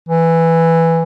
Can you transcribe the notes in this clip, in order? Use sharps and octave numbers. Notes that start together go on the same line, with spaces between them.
E3